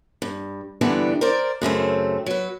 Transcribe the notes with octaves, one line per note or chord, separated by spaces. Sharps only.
G2
G2 D3 E3 G3 B3 D4
A#4 C5 D5
F#2 C#3 A3 C4
F#3 B4